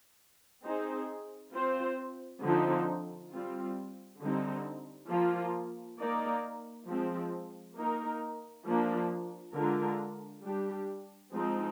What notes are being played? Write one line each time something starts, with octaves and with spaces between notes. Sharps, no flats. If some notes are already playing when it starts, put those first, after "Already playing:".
C4 D#4 G#4 C5
C4 F4 C5
D3 F3 C4 D#4
G3 C4 F4
D3 G3 C4 D#4
F3 A#3 F4
A#3 D#4 A#4 D5
F3 G#3 C4
A#3 D#4 A#4
F3 A#3 D4
D3 G#3 D4 F4 A#4
G3 D4 G4
F3 G#3 C4 D#4